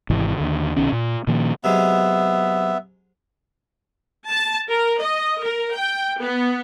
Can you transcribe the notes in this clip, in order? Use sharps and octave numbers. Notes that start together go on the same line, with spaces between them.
G#1 G#2 C3 E3
D#2 D3
C2 B2 D#3 C#4
A#2
A#2 D#3 F3 A#3
C3 F#3 G#3 B3 E5
A5
A#4
D#5
A#4
G5
B3